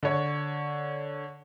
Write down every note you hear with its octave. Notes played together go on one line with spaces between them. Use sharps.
D3 C#5